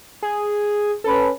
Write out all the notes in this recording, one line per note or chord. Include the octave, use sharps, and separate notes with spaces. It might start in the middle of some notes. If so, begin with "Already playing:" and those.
G#4
C#4 A4 B4